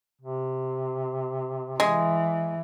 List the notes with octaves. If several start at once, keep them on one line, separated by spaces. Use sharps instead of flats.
C3
E3 G#3